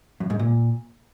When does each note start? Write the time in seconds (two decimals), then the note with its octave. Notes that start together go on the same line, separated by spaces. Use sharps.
0.20 F#2
0.30 G#2
0.39 A#2